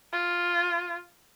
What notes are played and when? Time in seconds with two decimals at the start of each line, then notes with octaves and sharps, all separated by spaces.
0.13 F4